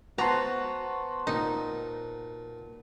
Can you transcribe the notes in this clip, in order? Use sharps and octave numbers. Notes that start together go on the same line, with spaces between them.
B3 F#4 B4 C5 F#5 A5 A#5
A#2 D#4